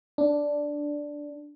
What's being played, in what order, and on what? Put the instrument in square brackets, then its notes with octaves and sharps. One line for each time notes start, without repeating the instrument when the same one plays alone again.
[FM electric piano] D4